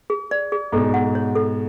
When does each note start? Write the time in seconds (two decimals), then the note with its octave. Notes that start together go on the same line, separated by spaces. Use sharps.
0.10 G#4
0.31 D5
0.52 G#4
0.72 G#2 B2 A4
0.94 F#5
1.15 C#5
1.35 A4